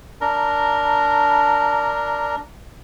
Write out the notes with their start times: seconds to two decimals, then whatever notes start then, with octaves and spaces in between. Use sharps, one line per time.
0.21 D4 A#4 A#5